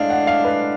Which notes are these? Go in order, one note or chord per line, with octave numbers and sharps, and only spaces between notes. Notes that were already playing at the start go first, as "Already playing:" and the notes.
Already playing: A2 G#3 D4 F5
F#5
F5
B4